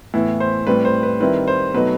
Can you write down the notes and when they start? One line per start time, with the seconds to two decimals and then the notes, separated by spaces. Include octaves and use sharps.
0.14 A2 E3 B3 E4
0.40 C5
0.67 A2 G3 C4 B4
0.85 C5
1.03 B4
1.20 D#3 G3 C4 E4 B4
1.47 C5
1.74 B2 F#3 A3 D#4 B4